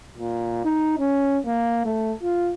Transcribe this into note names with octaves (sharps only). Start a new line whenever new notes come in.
A#2
D#4
C#4
A#3
A3
F4